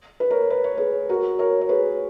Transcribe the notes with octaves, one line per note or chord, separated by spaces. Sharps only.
B4
A#4 C#5
B4
C#5
G#4 B4
F#4 A#4
A#4 C#5
C#5
G#4 B4